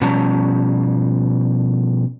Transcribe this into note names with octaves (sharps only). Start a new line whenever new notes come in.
B2 F3 G3 C#4 A5 A#5